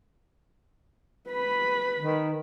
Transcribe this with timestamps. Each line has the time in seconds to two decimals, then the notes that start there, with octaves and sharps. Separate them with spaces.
1.29 B4 B5
2.00 D#3